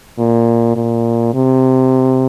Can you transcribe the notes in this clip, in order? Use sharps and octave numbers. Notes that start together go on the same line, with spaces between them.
A#2
A#2
C3